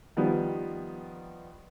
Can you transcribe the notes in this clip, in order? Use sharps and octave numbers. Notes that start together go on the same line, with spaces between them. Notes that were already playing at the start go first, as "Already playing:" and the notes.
D#3 F3 G3 B3